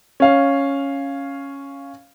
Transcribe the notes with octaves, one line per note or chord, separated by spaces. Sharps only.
C#4 F5